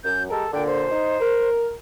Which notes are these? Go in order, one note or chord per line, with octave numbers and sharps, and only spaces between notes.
F#2 G6
G#3 G4 A4 A#4
A#2 D3 G5
C5
D#4
A#4